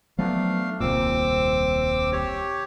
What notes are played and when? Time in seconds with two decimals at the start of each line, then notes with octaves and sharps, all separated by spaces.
0.18 F3 F#3 A3 B3 D4 F5
0.80 D#1 C2 A#2 C4 D6 E6
2.12 G4 C#5